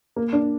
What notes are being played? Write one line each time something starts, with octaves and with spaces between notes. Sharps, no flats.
A#3
D4